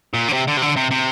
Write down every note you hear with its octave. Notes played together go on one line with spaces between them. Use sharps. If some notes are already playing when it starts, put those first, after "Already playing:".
A#2
D3
C3
D3
C3
D3
C3
C3